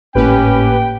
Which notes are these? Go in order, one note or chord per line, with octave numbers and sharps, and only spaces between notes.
G#1 A2 A#3 C#4 G4 B4 G5